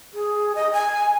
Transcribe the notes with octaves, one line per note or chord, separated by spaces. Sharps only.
G#4
D#5
G#5